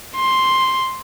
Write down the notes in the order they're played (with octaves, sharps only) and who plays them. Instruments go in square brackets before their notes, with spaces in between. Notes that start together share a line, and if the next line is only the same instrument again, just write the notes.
[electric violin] C6